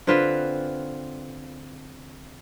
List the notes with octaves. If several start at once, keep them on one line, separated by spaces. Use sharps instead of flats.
D3 C4 F4 B4